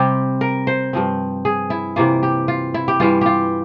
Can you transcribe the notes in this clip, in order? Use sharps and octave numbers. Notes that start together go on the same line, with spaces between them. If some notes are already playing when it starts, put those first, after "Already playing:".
Already playing: C3 G3 C4 G4
A#4
C5
G2 F3 C4
G#4
E4
C3 E3 A#3 F4
G4
F4
E4
G4
G2 E3 G3 F4
F4 G4